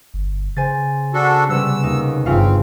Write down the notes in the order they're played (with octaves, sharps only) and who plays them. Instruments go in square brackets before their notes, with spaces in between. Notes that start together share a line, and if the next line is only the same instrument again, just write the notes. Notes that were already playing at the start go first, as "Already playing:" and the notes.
[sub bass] G1
[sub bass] C#3 [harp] C5 G#5 A6
[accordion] D4 F#4 A4
[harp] C3 B3 C#4 [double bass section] G3 [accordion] E6
[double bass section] D#2 [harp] D#4
[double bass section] G1 G2 [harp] C#3 F4 F5 [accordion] C4